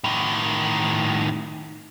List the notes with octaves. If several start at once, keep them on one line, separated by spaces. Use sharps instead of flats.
A2 D#3